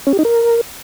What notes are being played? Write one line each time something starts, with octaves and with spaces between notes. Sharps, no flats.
C#4
G4
D#4
A#4